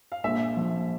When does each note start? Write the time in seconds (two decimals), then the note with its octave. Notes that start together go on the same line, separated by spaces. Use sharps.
0.12 F5
0.24 A#1 E5
0.57 F3